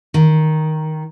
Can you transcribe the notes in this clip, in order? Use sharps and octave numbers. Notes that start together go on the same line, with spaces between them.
D#3